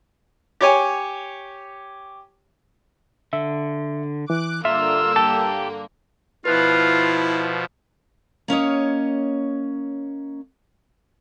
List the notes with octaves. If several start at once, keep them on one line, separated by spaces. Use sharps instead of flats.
G4 C#5 G#5
D3 E5
E3 D6 F#6
G2 D3 A#3 F4 E5 E6
G4 A4 A5
B2 F3 E4 F4 B4 F#6
A#3 C#4 C#5 D#5